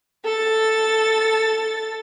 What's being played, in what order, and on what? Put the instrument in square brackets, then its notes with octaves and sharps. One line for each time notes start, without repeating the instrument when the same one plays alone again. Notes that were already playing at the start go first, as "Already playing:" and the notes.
[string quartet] A4 A6